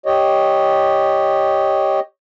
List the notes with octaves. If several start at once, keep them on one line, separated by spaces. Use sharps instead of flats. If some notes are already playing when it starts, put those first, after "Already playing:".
G4 C#5 D#5